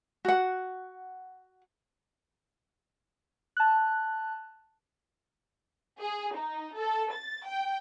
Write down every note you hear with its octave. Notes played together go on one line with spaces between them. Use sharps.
F#4 F#5
A5 F#6
G#4
D#4
A4
A6
G5